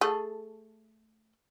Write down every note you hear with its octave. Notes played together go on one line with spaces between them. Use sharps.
A3 G#4 A4